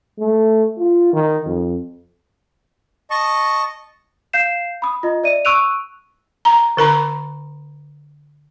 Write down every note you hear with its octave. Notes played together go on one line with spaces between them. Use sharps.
A3
F4
D#3
F2
D#5 A5 C#6
F5 G6 C7 E7
B5 D#6
F4 D#5
D5 E5 D#7
C#6 E6 F#6 D7 D#7 F7
A#5
D3 A#4 A#5 B5